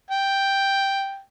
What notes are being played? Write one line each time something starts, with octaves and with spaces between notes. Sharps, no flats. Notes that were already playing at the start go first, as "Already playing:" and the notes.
G5